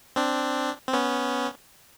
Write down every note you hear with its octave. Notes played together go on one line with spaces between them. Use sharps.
C4 D4
C4
B3 C#4